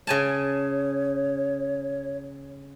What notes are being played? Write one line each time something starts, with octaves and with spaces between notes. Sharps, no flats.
C#3 C#5 G#5 A5